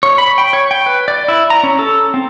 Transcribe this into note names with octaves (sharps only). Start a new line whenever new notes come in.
C#5
B5
G5
C#5
G5
B4
D5
E4
A#5
C#4
A4
C4